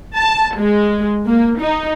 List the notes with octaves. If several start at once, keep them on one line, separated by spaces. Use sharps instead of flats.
A5
G#3
A#3
D#4